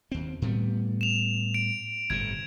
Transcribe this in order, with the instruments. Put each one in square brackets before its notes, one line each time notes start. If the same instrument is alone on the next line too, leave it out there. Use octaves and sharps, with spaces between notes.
[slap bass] D#2 C4
A2 G3 B3
[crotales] E7 F7
D7
[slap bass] G1 A2 C3 [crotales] G#6